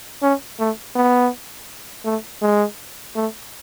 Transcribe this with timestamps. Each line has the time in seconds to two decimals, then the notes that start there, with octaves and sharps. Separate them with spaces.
0.23 C#4
0.59 A3
0.96 B3
2.05 A3
2.42 G#3
3.16 A3